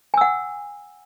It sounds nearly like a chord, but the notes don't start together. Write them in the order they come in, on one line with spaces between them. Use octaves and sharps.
G#5 E6 F#5